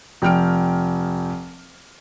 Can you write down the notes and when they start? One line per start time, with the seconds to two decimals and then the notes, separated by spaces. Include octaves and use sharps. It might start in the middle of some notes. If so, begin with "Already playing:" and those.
0.22 F1 G5 F6 D7